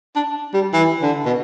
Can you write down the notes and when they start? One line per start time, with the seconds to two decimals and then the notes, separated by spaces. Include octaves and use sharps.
0.16 D4
0.54 G3
0.73 E3
1.02 D3
1.26 B2